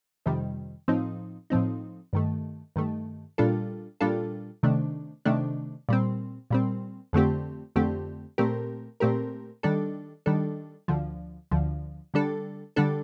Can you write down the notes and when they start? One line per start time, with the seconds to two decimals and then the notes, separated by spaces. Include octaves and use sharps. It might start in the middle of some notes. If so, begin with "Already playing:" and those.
0.26 F2 C3 D#3 G3
0.88 A2 F3 C4 D#4
1.50 A2 F3 C4 D#4
2.13 G2 D#3 A3
2.76 G2 D#3 A3
3.38 A#2 G3 D4 F4 A4
4.01 A#2 G3 D4 F4 A4
4.63 C3 D#3 A3 D4
5.25 C3 D#3 A3 D4
5.89 A#2 G3 C4
6.51 A#2 G3 C4
7.13 F2 D3 A3 C4 G4
7.76 F2 D3 A3 C4 G4
8.38 A#2 A3 C4 G4 A#4
9.00 A#2 A3 C4 G4 A#4
9.63 D#3 G3 D4 A4
10.26 D#3 G3 D4 A4
10.88 D2 D3 F3
11.51 D2 D3 F3
12.14 D3 G3 D4 A4
12.76 D3 G3 D4 A4